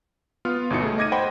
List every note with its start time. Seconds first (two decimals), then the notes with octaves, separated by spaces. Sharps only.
0.45 B3 F4 F6
0.70 G1 B2 D#4 C#7
0.82 A3 G#4
0.98 D#5 D6 G#6 A#6 D#7
1.12 C5 F#5 G5 B5